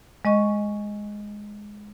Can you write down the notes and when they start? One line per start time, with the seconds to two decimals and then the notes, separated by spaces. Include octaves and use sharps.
0.25 G#3 D#5 C#6